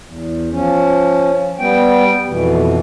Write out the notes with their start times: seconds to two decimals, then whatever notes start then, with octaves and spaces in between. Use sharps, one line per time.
0.03 E2
0.51 F3 C#4
1.59 G3 B3 G5
2.27 F2 B2 E3